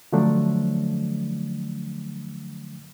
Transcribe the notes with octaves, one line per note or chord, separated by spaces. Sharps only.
D3 F3 F#3 A3 D4